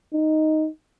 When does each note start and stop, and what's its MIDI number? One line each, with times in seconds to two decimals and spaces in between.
0.14 0.68 63